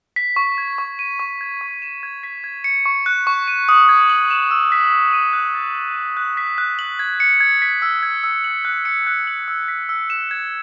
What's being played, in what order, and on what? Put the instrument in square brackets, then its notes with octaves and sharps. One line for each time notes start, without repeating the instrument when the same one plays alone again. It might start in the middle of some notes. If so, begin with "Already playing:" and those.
[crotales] B6
C#6
G#6
C#6
D#7
C#6
G#6
C#6
E7
G#6
B6
G#6
C#7
C#6
F#6
C#6
D#7
D#6
G#6
F#7
E7
E6
B6
E6
D#7
F#6
A6
F#7
D#7
F#6
B6
F#6
F#7
G#6
C#7
G#6
B6
E6
G#6
E6
F#7
F#6
C#7
F#6
F#7
E6
B6
E6
E7
G#6